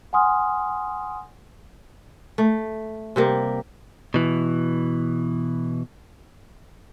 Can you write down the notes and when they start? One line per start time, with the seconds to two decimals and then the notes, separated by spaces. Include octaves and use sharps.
0.13 F#5 G#5 C6 D#6 F6
2.38 A3
3.16 C3 G3 A#3
4.14 B2 E3